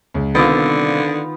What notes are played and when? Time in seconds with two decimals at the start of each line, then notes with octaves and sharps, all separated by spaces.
0.14 C#2
0.35 C2 D3 D#3 B3 C4 F4 D5 F5